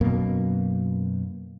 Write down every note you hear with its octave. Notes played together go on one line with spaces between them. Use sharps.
F#2 B2 A#3